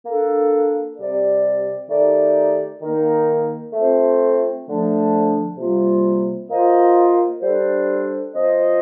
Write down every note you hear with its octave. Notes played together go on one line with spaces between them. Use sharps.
A#3 D4 A4
C3 G3 C4 G4 D5
D#3 A3 D#4 G4 D5
D#3 A#3 D#4 A#4
A3 C4 F4 C5
D3 F3 A3 D4
C3 G3 A#3 F4
A#3 F4 C5 D#5
G3 D4 A4 C5
F3 C4 F4 C5 D#5